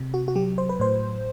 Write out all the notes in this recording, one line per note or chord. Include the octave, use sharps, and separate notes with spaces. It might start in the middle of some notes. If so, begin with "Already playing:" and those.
Already playing: C3
F#4
F#4
F#3 G4
C5
B4
A2 C5